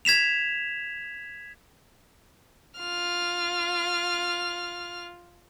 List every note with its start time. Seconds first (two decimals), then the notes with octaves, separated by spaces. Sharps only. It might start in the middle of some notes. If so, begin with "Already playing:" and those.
0.05 G#6 B6 E7 F7
2.79 F4 F6